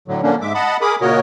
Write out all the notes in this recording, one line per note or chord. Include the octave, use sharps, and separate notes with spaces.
A2 D3 F#3
D3 F3 G3 A#3 C#4 D4
G#2 G#3 E5 D6
D#5 F#5 A5 B5
G#4 A#4 B5 D6 D#6
A#2 C#3 F#4 A#4 C#5 D#5